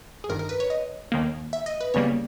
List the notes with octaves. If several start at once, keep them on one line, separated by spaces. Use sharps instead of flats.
G#4
G1 G2 D#3 A#4
A#4
B4
C#5
D#5
D#2 D#3 A#3
E5
D#5
B4
E2 C#3 G3 A#3 C#5